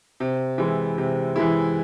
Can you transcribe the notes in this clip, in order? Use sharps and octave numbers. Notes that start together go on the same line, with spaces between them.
C3
E3 G#3 E4
C3
E3 G#3 E4